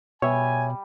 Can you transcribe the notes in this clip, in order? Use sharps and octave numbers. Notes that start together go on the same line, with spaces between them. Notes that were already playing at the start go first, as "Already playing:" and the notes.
B2 G3 C#5 E5 G#5